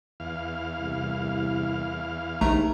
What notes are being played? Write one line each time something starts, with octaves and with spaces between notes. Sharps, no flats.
E2 F5
C2
A#1 D#2 A3 A#5